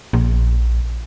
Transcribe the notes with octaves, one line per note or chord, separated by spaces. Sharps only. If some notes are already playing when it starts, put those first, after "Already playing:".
A#1